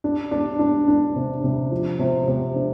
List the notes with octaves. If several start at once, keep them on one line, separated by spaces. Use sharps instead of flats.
D4
D4
D4
D4
C3
C3
F3
C3
C3
D4